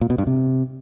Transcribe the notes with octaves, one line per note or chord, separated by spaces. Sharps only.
A#2
B2
G2
C3